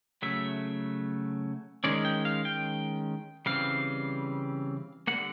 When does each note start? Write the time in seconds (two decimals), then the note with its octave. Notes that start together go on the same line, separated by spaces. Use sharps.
0.22 C#3 F#3 A3 E5
1.84 D#3 G#3 C#4 D5
2.05 G5
2.25 F5
2.45 G5
3.46 C#3 E3 G3 C4 F5
5.07 D3 G3 A#3 F#5